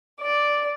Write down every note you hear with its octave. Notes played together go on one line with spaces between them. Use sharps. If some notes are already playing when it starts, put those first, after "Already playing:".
D5